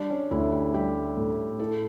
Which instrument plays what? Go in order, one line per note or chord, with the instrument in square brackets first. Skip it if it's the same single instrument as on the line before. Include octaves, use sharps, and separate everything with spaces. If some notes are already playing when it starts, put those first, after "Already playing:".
Already playing: [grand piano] G3 [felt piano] D4
[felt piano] C#4
[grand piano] D2 [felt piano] E4
[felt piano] G4
[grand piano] G3 [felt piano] G4
[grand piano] A2
[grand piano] E4 [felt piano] A4